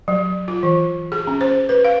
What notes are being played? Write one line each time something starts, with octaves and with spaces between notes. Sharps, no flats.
F#3
F4
E3
G#4
C#4
C5
B4
F5